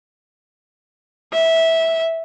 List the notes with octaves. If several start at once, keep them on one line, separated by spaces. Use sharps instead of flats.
E5